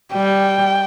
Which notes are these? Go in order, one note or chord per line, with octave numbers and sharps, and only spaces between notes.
G3 G5